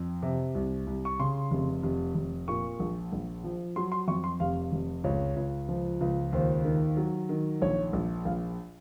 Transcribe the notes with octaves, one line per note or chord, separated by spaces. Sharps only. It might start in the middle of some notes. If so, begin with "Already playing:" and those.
Already playing: F2
C3
C2
C2
C#6
C#3 C6
F1
F1
F1
A#2 C#6
A#1
A#1
F3
F#3 C6
C6
F2 C#6
C6
F1 F5
F1
C#2 C#5
C#2
F3
C#2
D#2 C5
D#3
F#3
D#3
A#1 C#5
A#1
A#1 F5